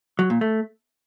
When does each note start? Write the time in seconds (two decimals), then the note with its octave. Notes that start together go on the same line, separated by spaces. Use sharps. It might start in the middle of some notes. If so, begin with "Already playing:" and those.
0.19 F#3
0.30 A#2
0.41 A3